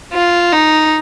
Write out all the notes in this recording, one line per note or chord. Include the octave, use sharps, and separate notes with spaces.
F4
D#4